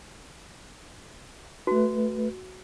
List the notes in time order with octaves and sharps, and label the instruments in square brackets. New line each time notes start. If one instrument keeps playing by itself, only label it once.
[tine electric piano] A3 B4 [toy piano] F#4